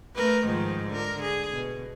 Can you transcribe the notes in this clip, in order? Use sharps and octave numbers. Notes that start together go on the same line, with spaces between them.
A3 A#4 B4
G#2 D#3 F3
D3 A#4
G#4
B2